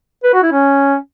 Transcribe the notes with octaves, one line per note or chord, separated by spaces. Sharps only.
B4
F#4
E4
C#4